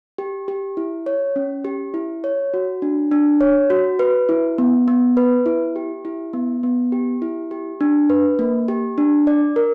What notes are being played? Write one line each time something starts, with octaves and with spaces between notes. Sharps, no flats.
G4
G4
E4
C#5
C#4
G4
E4
C#5
F#4
D4
D4
C#5
F#4
B4
E4
B3
B3
B4
E4
G4
E4
B3
B3
G4
E4
G4
D4
B4
A#3
G4
D4
D5
A#4